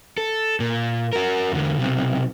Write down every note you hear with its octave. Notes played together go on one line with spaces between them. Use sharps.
A4
A#2
F#4 A#4
E2 D3
B1 C3